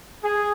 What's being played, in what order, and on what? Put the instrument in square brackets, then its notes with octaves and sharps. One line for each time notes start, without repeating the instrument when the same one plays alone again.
[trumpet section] G#4